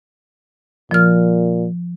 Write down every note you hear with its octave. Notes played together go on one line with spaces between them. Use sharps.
A#2 F3 F6